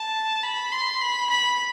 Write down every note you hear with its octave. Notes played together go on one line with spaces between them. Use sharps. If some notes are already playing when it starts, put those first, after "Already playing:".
Already playing: A5
B5
C6
B5
B5